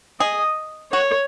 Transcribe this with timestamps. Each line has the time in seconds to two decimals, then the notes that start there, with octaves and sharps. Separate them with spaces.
0.20 G#4 D#5
0.92 F#4 C#5